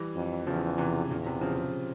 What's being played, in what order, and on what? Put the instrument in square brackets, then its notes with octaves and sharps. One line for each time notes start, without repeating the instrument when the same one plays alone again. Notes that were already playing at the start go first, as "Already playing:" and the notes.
Already playing: [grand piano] E3 G3
[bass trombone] F2
[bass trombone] E2 [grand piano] C#3 F3
[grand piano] C3 E3
[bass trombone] E2 [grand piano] A#2 C#3
[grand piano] C3
C#3 F3